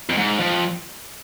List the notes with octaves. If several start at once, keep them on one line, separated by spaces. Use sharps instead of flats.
F2
G#2
F2